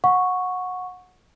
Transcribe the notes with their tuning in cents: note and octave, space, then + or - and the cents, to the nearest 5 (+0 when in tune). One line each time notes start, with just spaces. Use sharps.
F#5 -20 C#6 +0